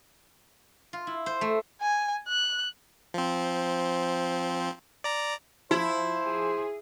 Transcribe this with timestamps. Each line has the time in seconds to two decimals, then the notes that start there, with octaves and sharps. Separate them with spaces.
0.93 F4
1.07 E4
1.26 C5
1.41 A3
1.82 G#5
2.28 F#6
3.14 F3 C4
5.04 D5 A#5
5.71 F3 E4 C5
6.26 G#4